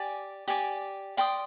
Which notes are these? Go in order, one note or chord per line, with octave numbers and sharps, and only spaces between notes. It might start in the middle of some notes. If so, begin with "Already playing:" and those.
Already playing: G4 D5 G#5 D6
G4 D5 G#5 D6
D5 G5 C6 D#6